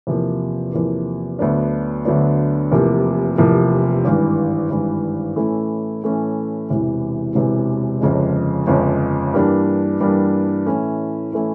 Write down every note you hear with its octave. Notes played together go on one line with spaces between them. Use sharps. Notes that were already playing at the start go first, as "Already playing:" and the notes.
E2 C3 F3 A#3
E2 C3 F3 A#3
D2 D3 F#3 B3 D4
D2 D3 F#3 B3 D4
F1 E2 C3 F3 A#3
F1 E2 C3 F3 A#3
G#1 G2 E3
G#1 G2 E3
A2 E3 A3 C#4 E4
A2 E3 A3 C#4 E4
E1 E2 C3 E3
E1 E2 C3 E3
G1 F2 C#3 F3 G#3
G1 F2 C#3 F3 G#3
G2 E3 G3 A#3 D4
G2 E3 G3 A#3 D4
A2 E3 A3 C#4 E4
A2 E3 A3 C#4 E4